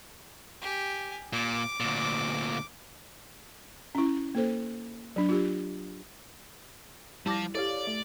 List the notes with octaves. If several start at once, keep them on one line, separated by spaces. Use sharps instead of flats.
G4 G#5
A#2 D6
D2 A#2
C#4 E4
A#3 A4 C5
F#3 D4
F4 G4
F3 G3 E4 A5 D6 A#6
E4 G4 A4 C#5 D5 F5
A3 D6